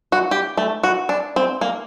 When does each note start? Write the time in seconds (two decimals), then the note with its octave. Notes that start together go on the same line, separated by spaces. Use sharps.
0.12 F#4
0.31 G4
0.57 A3
0.84 F#4
1.09 D4
1.36 C4
1.61 A#3